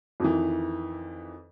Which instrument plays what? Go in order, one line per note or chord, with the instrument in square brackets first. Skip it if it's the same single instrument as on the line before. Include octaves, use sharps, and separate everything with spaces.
[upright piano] F2 D#3 E3